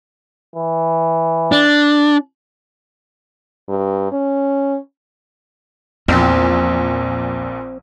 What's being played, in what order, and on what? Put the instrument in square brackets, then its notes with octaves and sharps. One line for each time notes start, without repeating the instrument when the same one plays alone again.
[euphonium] E3
[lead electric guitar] D4
[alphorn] G2
C#4
[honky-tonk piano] A#1 A#2 [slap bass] E2 [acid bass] C4